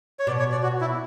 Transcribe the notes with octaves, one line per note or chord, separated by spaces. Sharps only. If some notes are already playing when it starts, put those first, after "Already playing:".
C#5
B2 D5
C#5
D5
F#4
E4